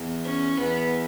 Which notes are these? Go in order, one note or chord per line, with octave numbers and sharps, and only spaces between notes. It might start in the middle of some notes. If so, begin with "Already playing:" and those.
Already playing: E2
C#4
E2 B3